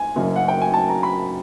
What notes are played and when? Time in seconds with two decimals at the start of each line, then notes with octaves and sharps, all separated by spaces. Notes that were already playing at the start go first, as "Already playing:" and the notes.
Already playing: G#5
0.16 F#1 F#2 C#3 F#3
0.36 F#5
0.48 G5
0.62 G#5
0.73 A5
0.88 A#5
1.03 B5